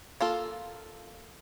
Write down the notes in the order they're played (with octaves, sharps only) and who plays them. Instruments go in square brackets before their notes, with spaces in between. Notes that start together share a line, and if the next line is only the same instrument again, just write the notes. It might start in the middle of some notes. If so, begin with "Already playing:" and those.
[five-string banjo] A#3 F4 A4